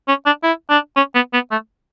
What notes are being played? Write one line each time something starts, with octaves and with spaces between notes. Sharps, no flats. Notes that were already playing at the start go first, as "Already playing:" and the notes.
C#4
D4
E4
D4
C#4
B3
B3
A3